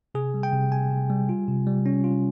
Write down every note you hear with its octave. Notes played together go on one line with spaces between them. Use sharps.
C3 G#4
G3
G5
C3
C3 G#5
C3
G3
F4
C3
G3
C#4
F4